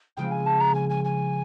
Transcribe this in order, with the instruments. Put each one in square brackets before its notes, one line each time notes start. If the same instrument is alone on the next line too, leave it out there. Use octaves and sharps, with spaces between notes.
[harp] C#3 F3 G#3 C4 [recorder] G5
[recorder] G#5
A5
A#5
G#5
G#5
G#5